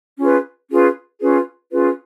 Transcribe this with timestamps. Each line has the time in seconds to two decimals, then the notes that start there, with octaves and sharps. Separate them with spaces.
0.19 C#4 F4 G#4 B4
0.70 C#4 F4 G#4 B4
1.20 C#4 F4 G#4 B4
1.71 C#4 F4 G#4 B4